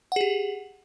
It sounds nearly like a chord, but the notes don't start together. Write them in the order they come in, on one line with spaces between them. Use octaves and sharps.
F#5 G#4 G4